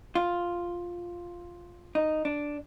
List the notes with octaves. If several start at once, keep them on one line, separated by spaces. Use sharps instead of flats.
F4
D#4
D4